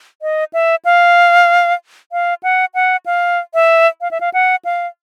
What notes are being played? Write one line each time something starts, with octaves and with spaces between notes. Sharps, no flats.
D#5
E5
F5
F5
F#5
F#5
F5
E5
F5
E5
F5
F#5
F5